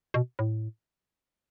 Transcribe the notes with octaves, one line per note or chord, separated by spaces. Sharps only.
B2
A2